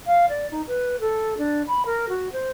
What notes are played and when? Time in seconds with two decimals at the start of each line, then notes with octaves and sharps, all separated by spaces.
0.07 F5
0.29 D5
0.51 D#4
0.68 B4
1.00 A4
1.38 D4
1.68 B5
1.86 A#4
2.09 F#4
2.32 C5